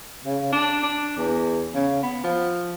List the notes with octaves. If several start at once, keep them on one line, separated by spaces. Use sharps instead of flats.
C#3
D4
D4
E2
C#3
B3
F3